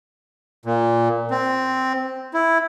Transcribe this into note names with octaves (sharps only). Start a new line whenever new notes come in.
A#2
C4
E4